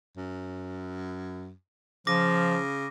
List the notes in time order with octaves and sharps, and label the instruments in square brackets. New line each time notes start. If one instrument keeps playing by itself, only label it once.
[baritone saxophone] F#2
[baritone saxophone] C#3 [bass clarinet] F3 [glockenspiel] D6 A#6